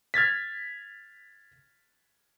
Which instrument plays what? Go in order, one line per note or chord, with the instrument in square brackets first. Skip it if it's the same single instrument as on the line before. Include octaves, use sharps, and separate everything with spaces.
[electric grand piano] F6 G#6 A6 B6